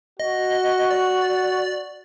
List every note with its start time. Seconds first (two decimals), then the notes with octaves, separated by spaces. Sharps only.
0.20 F#4 D#5
0.90 D5